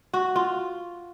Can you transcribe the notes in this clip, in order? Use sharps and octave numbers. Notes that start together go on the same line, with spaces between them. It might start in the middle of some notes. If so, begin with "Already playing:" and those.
F#4
F4